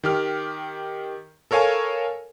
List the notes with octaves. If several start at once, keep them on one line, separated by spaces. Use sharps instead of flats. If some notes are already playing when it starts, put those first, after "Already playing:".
D#3 G4 F6
A4 A#4 C#5 F5 G#5 A5